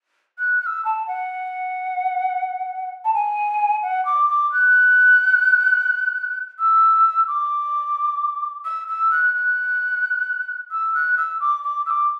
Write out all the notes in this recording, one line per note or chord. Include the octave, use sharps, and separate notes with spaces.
F#6
F#6
E6
A5
F#5
A5
G#5
F#5
D6
D6
F#6
E6
D6
E6
E6
F#6
F#6
E6
F#6
E6
D6
D6
E6
D6